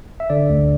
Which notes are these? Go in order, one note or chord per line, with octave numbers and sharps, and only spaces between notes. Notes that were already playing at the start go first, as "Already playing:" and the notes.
E5
D3 D5
D2